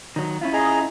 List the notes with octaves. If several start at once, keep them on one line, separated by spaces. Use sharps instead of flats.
D#3 F#3
C#4 E4 F4
G#4 D#5 A#5